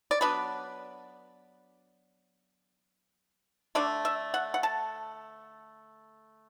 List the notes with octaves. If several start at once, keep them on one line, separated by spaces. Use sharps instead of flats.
D5
F#3 B3 D4 B4
D3 A3 D4 D5
E5
F#5
F#5
A5